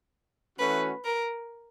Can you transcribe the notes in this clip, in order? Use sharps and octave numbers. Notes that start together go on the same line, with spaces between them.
E3 A3 C#4 F#4 B4
A#4